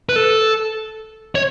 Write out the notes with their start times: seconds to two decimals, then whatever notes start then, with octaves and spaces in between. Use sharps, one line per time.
0.09 B4
0.16 A4
1.35 C#5